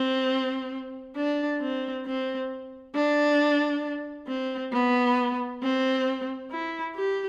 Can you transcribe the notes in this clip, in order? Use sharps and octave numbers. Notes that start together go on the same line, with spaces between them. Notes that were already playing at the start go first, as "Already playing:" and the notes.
Already playing: C4
D4
C4
C4
D4
C4
B3
C4
E4
G4